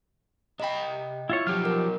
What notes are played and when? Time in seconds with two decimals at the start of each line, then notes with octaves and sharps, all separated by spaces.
0.60 C3 D#5 G5 B5
1.29 E4 F4 C#5
1.47 B1 F3 F#3 G4 F6
1.65 A#4